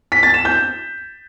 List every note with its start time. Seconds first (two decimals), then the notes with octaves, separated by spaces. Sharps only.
0.12 B6
0.23 A6
0.34 E7
0.45 G6